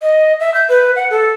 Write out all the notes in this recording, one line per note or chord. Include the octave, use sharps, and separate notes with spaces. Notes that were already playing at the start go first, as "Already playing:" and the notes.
D#5
E5
G6
B4
F#5
A4